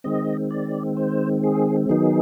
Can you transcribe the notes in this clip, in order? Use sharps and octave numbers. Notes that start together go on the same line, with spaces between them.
D#3 G#3 C4 D#5
D5
C5
G#4
D#3 F#3 B3 D#4 G#4